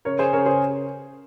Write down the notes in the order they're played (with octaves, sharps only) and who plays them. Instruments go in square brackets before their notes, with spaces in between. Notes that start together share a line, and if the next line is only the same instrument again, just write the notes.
[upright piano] C#3 A#4 C#5
G#4 C5
C#3 A#4 C#5
G#4 C5